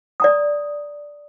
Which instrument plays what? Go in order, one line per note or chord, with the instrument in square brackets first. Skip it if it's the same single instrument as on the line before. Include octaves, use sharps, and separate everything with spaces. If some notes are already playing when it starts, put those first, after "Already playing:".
[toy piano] D5 A#5 D#6